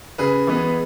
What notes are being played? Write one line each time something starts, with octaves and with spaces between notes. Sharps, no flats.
C#3 G#4 B4
E3 G#3 B3